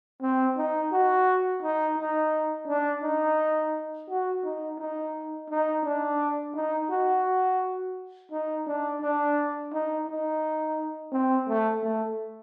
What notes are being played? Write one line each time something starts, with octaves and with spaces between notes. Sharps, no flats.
C4
D#4
F#4
D#4
D#4
D4
D#4
F#4
D#4
D#4
D#4
D4
D#4
F#4
D#4
D4
D4
D#4
D#4
C4
A3
A3